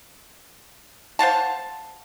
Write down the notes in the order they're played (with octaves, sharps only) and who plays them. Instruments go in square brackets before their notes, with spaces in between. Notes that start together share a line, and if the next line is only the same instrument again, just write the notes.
[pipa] C5 F5 F#5 A5